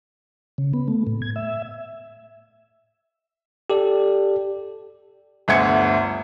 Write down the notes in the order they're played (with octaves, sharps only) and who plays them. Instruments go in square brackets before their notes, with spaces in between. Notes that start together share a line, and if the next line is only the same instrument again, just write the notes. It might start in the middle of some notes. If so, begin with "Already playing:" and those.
[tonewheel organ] C#3
B3
A3
A2
G#6
E5
[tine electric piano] G4 A4 D5
[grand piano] G1 D2 E5 F#5 G#6 C#7